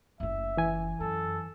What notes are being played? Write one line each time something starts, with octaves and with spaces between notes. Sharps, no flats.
F#1 A3 E5
E3 G#5
F#2 A4